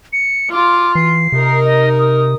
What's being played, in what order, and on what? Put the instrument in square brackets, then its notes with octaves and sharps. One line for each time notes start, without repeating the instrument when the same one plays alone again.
[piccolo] C#7
[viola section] F4 [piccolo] D6
[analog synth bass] E3 [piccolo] C7
[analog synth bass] C3 [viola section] D#4 A#4
[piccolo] D#5
D#6